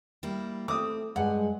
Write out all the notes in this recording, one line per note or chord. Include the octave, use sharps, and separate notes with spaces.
G3 A#3 E4
A3 C4 D6 D#6
G2 G#3 F#5 G#5